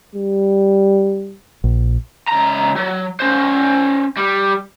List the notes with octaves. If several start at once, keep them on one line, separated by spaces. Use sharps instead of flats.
G3
A#1
C#2 A#5
F#3
C#4 C5
G3